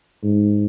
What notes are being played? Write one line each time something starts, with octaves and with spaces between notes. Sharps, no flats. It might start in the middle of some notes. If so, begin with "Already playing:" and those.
G#2